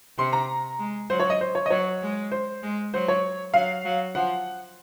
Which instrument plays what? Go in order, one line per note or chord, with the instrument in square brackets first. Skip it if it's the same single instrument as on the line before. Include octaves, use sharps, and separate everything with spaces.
[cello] C3 [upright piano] C6
[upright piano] A#5
[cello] G#3
[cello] F#3 [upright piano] C5
[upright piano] C#5
D#5
C5
C#5
D#5
[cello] F#3 [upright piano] C#5
[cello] G#3
[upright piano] C5
[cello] G#3
[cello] F#3 [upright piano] C5
[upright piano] C#5
[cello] F#3 [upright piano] F5
[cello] F#3
[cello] F3 [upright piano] F#5